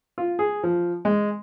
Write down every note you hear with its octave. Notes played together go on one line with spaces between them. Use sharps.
F4
G#4
F3
G#3